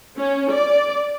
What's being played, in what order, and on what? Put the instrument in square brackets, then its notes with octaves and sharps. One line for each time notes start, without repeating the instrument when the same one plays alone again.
[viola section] C#4
D5